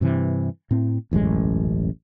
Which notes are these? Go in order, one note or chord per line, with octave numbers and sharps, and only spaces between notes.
G2 C3 E3
A2 C4
E1 A1 F#2 G#3